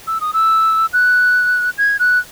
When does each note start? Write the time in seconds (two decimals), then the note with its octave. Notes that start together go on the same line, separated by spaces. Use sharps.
0.07 E6
0.21 D#6
0.33 E6
0.93 F#6
1.78 G#6
1.99 F#6